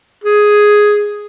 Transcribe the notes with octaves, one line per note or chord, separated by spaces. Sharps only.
G#4